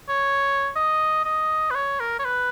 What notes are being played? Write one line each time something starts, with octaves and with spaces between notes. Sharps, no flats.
C#5
D#5
D#5
B4
C#5
A#4
C#5
B4